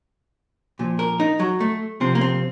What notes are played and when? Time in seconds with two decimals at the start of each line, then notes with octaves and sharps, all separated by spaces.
0.79 A#2 F3
0.99 A#4
1.20 D#4
1.40 F#3
1.60 A3
2.00 C3 F3 C4
2.15 A#3
2.21 C4